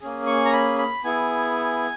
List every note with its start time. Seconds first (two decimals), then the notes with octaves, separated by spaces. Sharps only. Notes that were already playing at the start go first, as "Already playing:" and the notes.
0.01 A#3 C#4 G#4
0.26 C#6
0.45 A#5
0.53 B5
0.78 B5
1.04 B3 E4 G#4 G#5